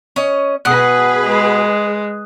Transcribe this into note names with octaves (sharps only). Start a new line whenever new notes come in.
C#4 D#5
B2 G#4 B4 F#5 D#6 F#6
G#3